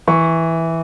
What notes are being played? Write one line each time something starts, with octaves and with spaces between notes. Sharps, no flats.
E3 C#6